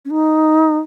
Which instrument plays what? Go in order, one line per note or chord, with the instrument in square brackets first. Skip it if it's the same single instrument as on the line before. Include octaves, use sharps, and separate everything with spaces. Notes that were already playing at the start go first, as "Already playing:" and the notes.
[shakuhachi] C#4
D#4